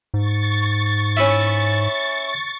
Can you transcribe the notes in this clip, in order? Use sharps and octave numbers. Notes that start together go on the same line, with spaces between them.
G#2 C#6 A6
C#4 E4 E5